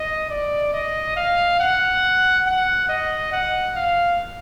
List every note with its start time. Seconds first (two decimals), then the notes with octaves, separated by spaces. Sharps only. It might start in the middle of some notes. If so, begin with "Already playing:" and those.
Already playing: D#5
0.30 D5
0.73 D#5
1.17 F5
1.60 F#5
2.46 F#5
2.89 D#5
3.32 F#5
3.76 F5